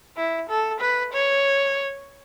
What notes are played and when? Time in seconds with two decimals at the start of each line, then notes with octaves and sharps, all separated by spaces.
0.17 E4
0.49 A4
0.80 B4
1.13 C#5